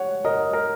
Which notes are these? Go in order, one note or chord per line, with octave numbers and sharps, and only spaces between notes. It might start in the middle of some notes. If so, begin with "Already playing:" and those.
Already playing: C#5 F#5
A#4 D#5
A#4